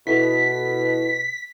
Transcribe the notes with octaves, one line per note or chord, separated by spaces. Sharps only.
B2 E4 A4 B6